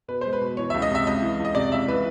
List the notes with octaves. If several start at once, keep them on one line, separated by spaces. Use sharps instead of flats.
B2 B4
G#3 C5
B4
B2
E3 C#5
C#2 E5
D#5
C3 E5
C#2 D#5
E3
C#2
D#5
C3 D5
C#2 E5
E3 B4